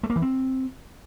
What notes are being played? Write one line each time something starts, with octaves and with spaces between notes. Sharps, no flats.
A3
A#3
E3
C4